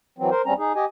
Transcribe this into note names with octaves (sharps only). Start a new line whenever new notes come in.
E3 F#3 C4
A#4 C5
E2 G3 C4 C#4 A#5
D#4 G#4
G4 D#5 G#5